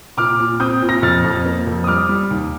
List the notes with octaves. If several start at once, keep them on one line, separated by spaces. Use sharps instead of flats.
A#2 D6 F6
A#2
C4 D#6 G6
A#2
A#6
F2 F6 A6
F2
A#3
F2
D#6
G3 D6 F6
G3
D#2